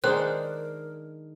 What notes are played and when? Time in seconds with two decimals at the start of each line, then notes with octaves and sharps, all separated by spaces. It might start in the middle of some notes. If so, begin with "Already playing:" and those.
0.04 D#3 G#3 D4 A#4 C5 F#6